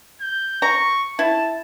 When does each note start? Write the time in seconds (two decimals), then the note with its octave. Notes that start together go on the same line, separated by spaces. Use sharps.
0.21 G6
0.62 A#5 C#6
1.19 E4 A5